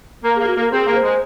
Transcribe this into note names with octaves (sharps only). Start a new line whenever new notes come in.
A#3
A#3 G#4
F#4
A#3 A#4
C4 G#4
A#3
C5
G#3